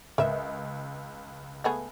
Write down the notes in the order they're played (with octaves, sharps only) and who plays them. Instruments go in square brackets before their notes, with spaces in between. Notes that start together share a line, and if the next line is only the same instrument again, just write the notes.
[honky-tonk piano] C#2 [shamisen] A#4 B4 E5
[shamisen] A3 B3 G#4